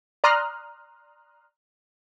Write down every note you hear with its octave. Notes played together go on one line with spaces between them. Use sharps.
D5 A#5 C6 D#6 F6 F#6